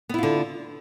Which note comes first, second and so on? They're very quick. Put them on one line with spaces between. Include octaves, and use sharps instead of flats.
B3 E4 F4 D3